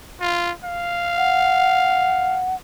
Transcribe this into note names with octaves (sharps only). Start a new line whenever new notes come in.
F4
F5
F#5